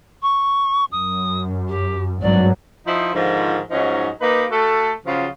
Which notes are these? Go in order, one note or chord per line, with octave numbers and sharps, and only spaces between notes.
C#6
F#2 D#6
G4
G#1 G2 F#3 D5
F3 D#4 E4 C5
G#2 D3 D#3 F3
G#2 F3 F#3 C#4 D#4
A#3 D#4 G4 B4
A3 F#4 A4
C#3 F3 F#3 F4 G#4